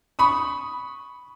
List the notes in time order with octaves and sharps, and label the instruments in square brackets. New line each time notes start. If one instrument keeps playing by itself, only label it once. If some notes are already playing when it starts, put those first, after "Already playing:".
[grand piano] B5 C#6 D#6